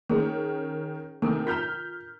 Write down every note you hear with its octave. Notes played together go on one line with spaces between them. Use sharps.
D#3 C#4 G#4 A#4
C3 D#3 A3 D4 A4 A#4
F4 A#5 F6 G6 B6